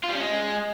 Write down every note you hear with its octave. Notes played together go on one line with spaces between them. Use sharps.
F4
G3
C#4
G#3